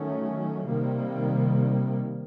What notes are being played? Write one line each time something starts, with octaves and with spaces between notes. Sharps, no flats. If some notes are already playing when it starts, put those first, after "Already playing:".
Already playing: D#3 F#3 A3 C#4
C3 D#3 G3 A#3